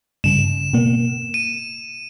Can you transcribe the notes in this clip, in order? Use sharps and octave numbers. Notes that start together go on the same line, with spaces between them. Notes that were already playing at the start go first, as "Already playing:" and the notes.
G2 C#3 E7
B2 A#3
D#7